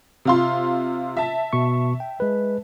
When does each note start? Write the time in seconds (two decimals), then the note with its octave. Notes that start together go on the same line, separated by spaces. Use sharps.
0.25 C3 F4 C6
1.17 E5 A5
1.53 B2 B3 C#6
2.00 G5
2.20 G#3 B4